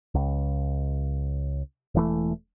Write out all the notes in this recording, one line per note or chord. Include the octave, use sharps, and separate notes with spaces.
C#2
E1 E3 A3